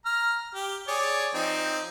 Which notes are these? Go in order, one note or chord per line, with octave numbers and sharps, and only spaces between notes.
A#5 F6
G4
G#4 C#5 D5
F3 C4 D#4